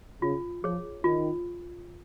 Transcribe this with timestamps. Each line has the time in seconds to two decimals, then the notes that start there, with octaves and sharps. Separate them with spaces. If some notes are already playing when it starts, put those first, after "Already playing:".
0.22 C#3 F4
0.64 F3 G#4 C#5
1.04 D#3 F4